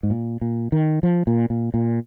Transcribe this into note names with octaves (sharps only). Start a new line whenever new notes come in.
G#2
A#2
A#2
D#3
F3
A#2
A#2
A#2